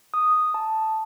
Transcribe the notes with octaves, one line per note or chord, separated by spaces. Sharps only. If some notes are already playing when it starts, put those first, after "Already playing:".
D#6
A5